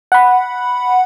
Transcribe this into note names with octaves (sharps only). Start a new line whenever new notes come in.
F#5 B5